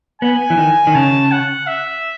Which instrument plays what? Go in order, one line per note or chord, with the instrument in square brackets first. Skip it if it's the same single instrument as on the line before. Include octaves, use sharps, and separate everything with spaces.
[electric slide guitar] B3 [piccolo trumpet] G#5
[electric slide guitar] E3
D#3
D#3
[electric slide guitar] C#3 [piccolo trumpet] A5
[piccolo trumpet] F#5
E5